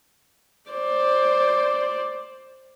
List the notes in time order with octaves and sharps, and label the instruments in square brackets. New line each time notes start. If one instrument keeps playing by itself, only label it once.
[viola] C5 D5